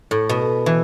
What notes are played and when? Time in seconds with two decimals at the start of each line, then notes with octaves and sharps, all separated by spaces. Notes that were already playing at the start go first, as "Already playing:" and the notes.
0.11 A2
0.29 B2
0.66 E3